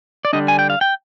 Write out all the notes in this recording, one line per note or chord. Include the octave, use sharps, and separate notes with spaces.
D5
D3 G3 D4 D#5
G#5
G5
F5
G5